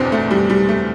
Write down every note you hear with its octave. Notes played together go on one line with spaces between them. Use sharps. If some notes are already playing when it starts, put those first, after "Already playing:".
Already playing: F#1 E2 B2 C4 D4
A3
G3
G3
A3